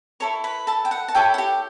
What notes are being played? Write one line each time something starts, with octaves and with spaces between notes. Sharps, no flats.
E4 A4 C#5 C#6
B4 B5
A4 A5
G5
F#5
A5
E4 G4 A4 C#5 G5
F#5
G4 G5